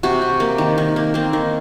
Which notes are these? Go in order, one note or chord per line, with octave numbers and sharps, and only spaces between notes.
C3 F#4
C3
A#3
D#3
D#3
A#3
A#3 C4
D#3